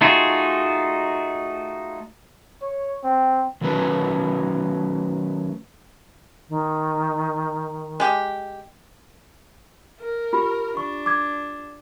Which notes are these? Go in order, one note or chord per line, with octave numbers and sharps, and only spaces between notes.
A3 D#4 F4 F#4 G#4
C#5
C4
D#3 F#3 A3 C#4 B4
D#3
G#3 G4
A#4
F4 G4 B5
D4 C#6
D6 G#6